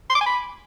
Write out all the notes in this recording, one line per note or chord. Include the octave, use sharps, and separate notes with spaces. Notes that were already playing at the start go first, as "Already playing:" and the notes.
C6
D6
G#5
B5